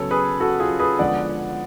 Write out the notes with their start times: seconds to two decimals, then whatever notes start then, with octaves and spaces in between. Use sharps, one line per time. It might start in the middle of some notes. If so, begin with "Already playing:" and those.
Already playing: C#3 F#3 B3 A4 C#5
0.11 G#4 B4
0.40 F#4 A4
0.60 F4 G#4
0.79 G#4 B4
0.99 D3 F3 G#3 B3 D5 F#5